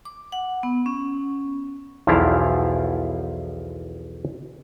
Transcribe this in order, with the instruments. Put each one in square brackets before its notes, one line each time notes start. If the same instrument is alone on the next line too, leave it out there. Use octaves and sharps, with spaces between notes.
[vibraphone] D6
F#5
B3
C#4
[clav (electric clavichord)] B1 E2 F3 E4 D5 F5